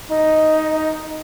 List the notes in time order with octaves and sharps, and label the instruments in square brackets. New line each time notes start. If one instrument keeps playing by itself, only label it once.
[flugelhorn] D#4 [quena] D#5